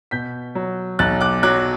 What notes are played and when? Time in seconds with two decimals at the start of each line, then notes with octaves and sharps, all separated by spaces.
0.11 B2 G6 B6
0.55 F#3
0.99 B1 F#6 A6
1.21 D6 F#6
1.43 F#3 D6 F#6